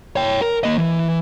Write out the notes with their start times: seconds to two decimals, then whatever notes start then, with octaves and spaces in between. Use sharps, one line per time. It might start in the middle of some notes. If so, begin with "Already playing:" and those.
0.16 C#5 G5
0.42 A#4
0.63 A#3 D#5
0.78 E3